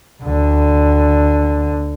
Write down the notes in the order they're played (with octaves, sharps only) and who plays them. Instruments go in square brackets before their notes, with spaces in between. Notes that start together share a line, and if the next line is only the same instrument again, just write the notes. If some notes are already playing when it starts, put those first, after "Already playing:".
[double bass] D2 D3